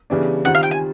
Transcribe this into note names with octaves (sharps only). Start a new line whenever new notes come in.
C#3 E3 G3 B3 D4
D#3 G3 C4 F4 F#5
F5
G5
G#5